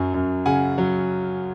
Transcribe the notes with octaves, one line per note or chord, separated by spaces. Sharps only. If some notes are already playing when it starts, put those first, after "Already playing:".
Already playing: F#2 F#3
F#2
C#3 F#5 G#5
F#3